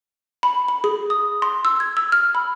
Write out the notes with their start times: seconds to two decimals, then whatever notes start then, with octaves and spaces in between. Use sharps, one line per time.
0.43 B5
0.68 B5
0.84 G#4
1.10 D#6
1.42 C6
1.65 E6
1.80 G#6
1.97 E6
2.12 F6
2.35 B5